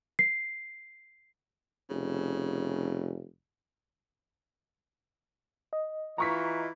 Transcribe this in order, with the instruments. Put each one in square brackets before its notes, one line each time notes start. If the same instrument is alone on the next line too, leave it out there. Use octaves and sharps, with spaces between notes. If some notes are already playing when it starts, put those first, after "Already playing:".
[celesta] C7
[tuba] F1 [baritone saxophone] C#3
[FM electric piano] D#5
[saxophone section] E3 F4 [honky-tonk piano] A#5 C#6 B6